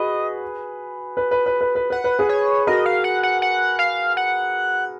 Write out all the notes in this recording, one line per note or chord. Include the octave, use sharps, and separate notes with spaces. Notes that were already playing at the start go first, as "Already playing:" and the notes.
Already playing: F#4 G#4 B4 D#5
B4
B4
B4
B4
B4
B4 F#5
B4
G#4 B4
C#5
F#4 A#4 D#5
F5
F#5
F#5
F#5
F5
F#5